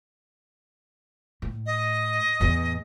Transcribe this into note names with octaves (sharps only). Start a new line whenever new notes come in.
A2
D#5
E2 A2